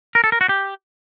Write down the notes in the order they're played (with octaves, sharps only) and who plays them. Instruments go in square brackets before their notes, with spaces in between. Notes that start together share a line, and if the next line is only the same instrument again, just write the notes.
[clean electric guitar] A#4
A4
A#4
F#4
G4